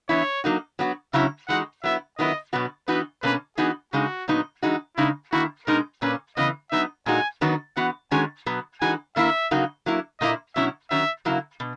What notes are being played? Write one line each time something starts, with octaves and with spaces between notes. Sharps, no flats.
E3 B3 E4 C#5
F#3 A#3 D#4 F#4
F#3 B3 F#4
C#3 F#3 C#4 E4 E5
E3 G#3 D#4 F#4 F#5
F#3 B3 E4 E5
D#3 F#3 B3 E4 D#5
B2 F#3 B3 F#4
E3 B3 D#4 F#4 B4
B2 A#3 C#4 B4
E3 B3 D#4 F#4 G#4
C#3 G#3 D#4 F#4
A#2 F#3 B3 D#4
E3 G#3 D#4 F#4
C#3 G#3 D#4 E4
D#3 A#3 E4 F#4
B2 G#3 D#4 A#4
A#2 A#3 C#4 B4
C#3 E3 B3 D#5
F#3 B3 D#4 E5
A#2 G#3 D#4 F#4 G#5
D#3 F#3 B3 D#4 F#4
E3 B3 F#4 F#5
D#3 G#3 C#4 F#4 G#5
B2 F#3 B3
E3 G#3 D#4 F#4 G#5
D#3 A#3 E4 E5
C#3 F#3 A#3 D#4 F#4
F#3 A#3 E4
A#2 A#3 E4 D#5
B2 F#3 C#4 E4 E5
D#3 F#3 C#4 E5
C#3 F#3 A#3 E4
B2